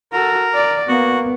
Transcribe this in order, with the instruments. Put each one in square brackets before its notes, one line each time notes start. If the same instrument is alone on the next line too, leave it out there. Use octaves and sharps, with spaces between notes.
[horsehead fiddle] F#4 A4 [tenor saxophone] A#4
[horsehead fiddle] D5
[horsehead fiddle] A#3 [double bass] B3 [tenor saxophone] F#4